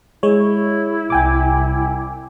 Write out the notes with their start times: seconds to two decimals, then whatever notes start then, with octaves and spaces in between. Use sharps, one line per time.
0.23 G#3 E4 C#5
1.10 C2 G5 G#5 D6